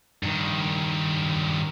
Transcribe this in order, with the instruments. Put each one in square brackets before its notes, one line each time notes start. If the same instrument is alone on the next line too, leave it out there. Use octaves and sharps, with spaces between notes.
[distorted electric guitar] G2 D#3